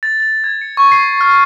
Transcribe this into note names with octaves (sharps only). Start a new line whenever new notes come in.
A6
A6
G#6
C#7
C#6
C7
F6